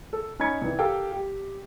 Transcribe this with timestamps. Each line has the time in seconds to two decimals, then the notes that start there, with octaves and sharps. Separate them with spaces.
0.13 A4
0.40 C#4 D#4 D#5 B5 G#6 C#7
0.61 C2 E3
0.79 G4 A4 A#4 F5 G5
1.12 G4